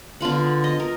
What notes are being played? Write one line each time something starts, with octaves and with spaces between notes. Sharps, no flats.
D3 B3 F4 F#5
D#5
A#4